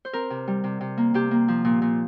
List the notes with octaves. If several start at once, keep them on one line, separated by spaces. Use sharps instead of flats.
C5
C4 A#4
C3
G3
C3
C3
A#3
C3 G4
A#3
F3
A#2
A#2